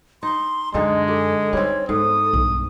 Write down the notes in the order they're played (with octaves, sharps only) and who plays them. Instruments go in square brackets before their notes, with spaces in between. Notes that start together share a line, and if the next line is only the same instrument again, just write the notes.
[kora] D#4 [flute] C6
[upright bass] F#2 [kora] D3 D#4 A4 [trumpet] G#3 [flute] D#5
[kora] G4 [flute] A4
[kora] G3 C4 [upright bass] D#4 E4 [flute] C#5
[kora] G#2 [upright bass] B3 [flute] A4 [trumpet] D#6
[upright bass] B1 G2